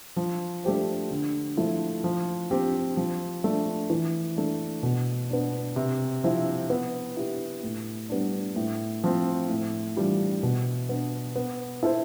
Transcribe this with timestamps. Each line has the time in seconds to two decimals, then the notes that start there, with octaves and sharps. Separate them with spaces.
0.16 F3
0.64 A3 D4 G4 C5
1.11 D3
1.57 F3 A3 E4
2.04 F3
2.51 C4 G4
2.97 F3
3.44 A3 D4
3.90 E3
4.37 A3 D4
4.83 B2
5.30 B3 D4
5.76 C3
6.24 F3 C4 E4
6.70 B3
7.17 E4 G4
7.63 A2
8.09 G3 B3 D4
8.56 A2
9.04 F3 C4
9.49 A2
9.97 E3 G3 D4 F4
10.43 B2
10.89 B3 D4
11.36 B3
11.83 E4 A4 C5